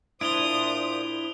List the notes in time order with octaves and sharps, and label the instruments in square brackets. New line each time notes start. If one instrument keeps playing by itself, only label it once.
[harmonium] A#2 C5 [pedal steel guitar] D4 E4 [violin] D#6 [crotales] D7 F7 G7